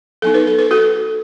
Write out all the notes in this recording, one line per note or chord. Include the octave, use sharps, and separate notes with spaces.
F#3 B3 D#4 A4
B4
A4
B4
F#4 A4